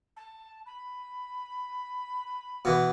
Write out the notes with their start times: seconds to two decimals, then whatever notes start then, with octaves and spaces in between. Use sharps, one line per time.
0.16 A5
0.66 B5
2.65 B2 E3